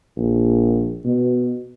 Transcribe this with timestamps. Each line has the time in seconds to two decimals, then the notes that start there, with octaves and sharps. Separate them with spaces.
0.17 A#1
1.05 B2